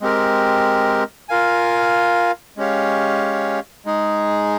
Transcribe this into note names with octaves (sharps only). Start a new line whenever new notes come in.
G#3 C4 G4 A#4
F4 A#4 F5 G#5
G#3 C#4 G4 C#5 F5
G#3 D#4 G#4